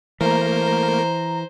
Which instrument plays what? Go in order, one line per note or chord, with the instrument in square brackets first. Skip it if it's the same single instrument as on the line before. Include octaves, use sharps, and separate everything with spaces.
[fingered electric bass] E3 [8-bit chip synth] A3 A#3 A#4 [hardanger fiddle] C5 [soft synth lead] A#5